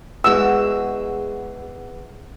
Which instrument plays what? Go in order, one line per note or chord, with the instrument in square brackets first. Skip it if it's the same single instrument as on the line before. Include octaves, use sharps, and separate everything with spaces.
[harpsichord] E2 [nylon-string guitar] G#3 F#4 [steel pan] E6